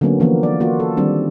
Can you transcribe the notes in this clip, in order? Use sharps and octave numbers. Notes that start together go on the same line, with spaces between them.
D3 F#3 A#3 B3 C#4
E3 F3 A#3 B3
D5
A#3 F4 F#4
A4
D#3 G3 C4 D4